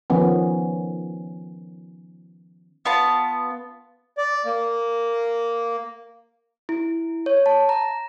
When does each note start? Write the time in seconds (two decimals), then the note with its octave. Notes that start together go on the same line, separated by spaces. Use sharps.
0.10 D#3 F3 B3 C#4
2.85 B3 F4 A5
4.18 D5
4.45 A#3
6.69 E4
7.26 C#5
7.46 A5
7.69 A#5